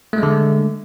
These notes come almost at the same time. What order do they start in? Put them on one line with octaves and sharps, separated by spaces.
A3 G#3 D3